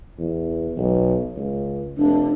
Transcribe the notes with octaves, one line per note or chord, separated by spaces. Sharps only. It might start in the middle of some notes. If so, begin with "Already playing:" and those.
E2
B1
C#2
F1 D4